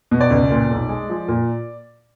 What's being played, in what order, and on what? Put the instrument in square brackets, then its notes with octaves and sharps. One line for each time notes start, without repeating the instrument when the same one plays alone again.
[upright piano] B2
D5
C#2
A#2
B1
G#3
F3
A#2